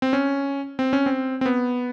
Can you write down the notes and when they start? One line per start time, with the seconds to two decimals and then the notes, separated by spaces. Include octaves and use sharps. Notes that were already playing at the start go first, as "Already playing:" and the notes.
0.02 C4
0.13 C#4
0.79 C4
0.93 C#4
1.06 C4
1.41 C4
1.46 B3